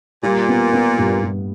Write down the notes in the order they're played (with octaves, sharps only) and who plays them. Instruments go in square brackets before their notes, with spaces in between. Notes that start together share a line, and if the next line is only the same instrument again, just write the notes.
[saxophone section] A#2 [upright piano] G3
[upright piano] B3
B3
G2
G2